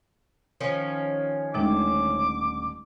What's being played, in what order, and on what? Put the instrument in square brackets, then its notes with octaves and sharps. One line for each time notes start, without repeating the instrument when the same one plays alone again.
[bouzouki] D#3 F3 C#4
[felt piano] D#1 D3 A3 [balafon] G#3 D#4 G5 [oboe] D6